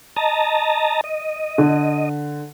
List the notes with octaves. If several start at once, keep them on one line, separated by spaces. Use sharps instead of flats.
D#5 A5 A#5
D#5
D3